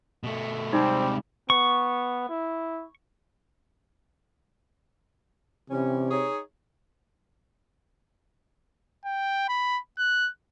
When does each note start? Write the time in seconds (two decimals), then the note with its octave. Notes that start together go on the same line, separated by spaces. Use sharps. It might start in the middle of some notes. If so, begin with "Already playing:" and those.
0.24 B2 A3
0.73 C3 G3 G#3 C4 D#4
1.50 B3 C#6
2.29 E4
5.70 C3 E3 G3 C#4
6.11 D#4 G#4 C#5
9.05 G5
9.49 B5
9.98 F#6